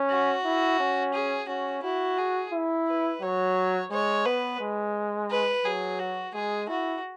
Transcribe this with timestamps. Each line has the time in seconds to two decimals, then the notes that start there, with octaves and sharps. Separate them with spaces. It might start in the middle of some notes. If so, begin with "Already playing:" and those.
Already playing: C#4
0.09 F#4
0.45 E4
0.80 C#4
1.14 G#4
1.48 C#4 F#4
1.83 E4 F#4
2.18 G#4
2.53 E4
2.88 B4
3.22 F#3 C#5
3.91 G#3 C#5
4.25 B3 B4
4.60 G#3
5.30 B4
5.65 F#3 G#4
5.99 F#4
6.34 G#3 G#4
6.68 E4 F#4